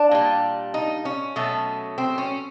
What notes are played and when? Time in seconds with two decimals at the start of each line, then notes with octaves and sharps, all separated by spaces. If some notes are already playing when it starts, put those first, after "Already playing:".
Already playing: D4
0.11 A#2 G3
0.74 D#4
1.05 C#4
1.36 B2 F#3 A3
1.98 C4
2.18 C#4